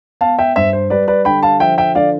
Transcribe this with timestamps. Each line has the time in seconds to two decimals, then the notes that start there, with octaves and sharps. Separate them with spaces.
0.21 B3 F5 A5
0.39 E5 G5
0.55 G2 C5 E5
0.73 C5
0.90 G3 B4 D5
1.08 B4 D5
1.25 D3 G5 B5
1.43 F5 A5
1.60 F3 E5 G5
1.78 E5 G5
1.95 D3 D5 F5